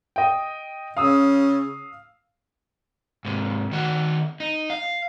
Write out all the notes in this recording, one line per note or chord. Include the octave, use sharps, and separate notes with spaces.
D#5 G5
C#3 F5 D#6 E6
G#2 C3
D#3 F#4
D#4
F5